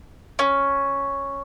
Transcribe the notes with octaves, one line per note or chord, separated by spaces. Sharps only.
C#4